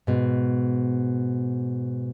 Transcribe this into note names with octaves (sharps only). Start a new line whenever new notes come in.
G#2 B2